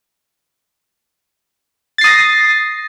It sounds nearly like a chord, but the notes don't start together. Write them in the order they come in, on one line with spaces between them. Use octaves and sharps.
A6 C7 D#6 A#6